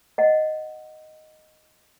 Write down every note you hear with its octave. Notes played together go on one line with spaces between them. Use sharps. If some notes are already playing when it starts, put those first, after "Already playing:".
D#5 F#5